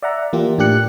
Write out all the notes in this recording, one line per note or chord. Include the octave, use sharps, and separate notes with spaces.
D5 E5 F#5 A#5
E3 A#3 F4 G4
A2 D4 G4 F#6 C#7